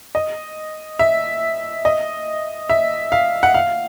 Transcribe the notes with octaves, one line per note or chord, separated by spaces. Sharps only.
D#5
E5
D#5
E5
F5
F#5
F5